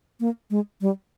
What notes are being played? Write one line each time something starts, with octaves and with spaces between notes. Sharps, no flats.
A#3
G#3
G3